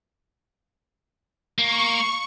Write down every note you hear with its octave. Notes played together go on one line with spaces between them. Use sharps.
A#3 C#6